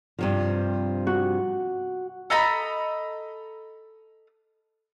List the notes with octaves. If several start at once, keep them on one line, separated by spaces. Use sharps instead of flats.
G2 C3 F3
F#4
A4 D#5 A#5 B5